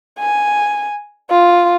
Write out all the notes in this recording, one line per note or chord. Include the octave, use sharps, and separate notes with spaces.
G#5
F4